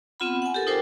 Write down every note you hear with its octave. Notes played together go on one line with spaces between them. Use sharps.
B3 C4 F4 F#5 B5
F#5 G#5
G4 A4 A#4
D#4 F4 A#4 C5 G5 D6